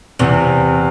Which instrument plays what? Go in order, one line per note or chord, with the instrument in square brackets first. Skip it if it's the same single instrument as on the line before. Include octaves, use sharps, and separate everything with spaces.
[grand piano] E2 [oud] C3